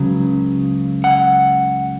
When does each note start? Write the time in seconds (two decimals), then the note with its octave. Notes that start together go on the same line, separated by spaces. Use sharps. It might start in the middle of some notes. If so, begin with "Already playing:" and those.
Already playing: C#2 C#3 F#3
1.04 F#5